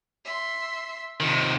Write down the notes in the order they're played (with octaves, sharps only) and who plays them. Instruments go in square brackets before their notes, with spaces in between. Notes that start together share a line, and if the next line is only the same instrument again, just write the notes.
[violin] E5 C6
[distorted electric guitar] C3 D#3 [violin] F4 E7